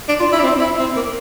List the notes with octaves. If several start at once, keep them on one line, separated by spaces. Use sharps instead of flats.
D4
F4
E4
D4
C4
E4
C4
A#3